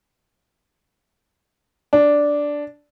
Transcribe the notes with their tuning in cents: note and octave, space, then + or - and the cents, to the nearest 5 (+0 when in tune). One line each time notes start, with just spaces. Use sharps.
D4 -5